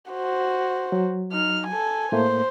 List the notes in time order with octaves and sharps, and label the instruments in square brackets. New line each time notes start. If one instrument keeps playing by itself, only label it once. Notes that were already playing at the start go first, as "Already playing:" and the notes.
[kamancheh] F#4 C5
[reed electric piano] F#3
[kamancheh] D#4 F6
A4 G#5
[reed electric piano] A2 A3 A#3 [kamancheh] C5